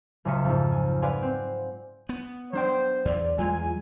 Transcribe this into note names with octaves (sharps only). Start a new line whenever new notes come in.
F#1 C#2 C#3 D#5 E5 C#7
F2 G#2
G#5
B4 D5 F5 F#5 G#5 C6
C4
B3
F#3 D4 C5 G5
E2 D5
E2 F#3 G#3 F4 G#5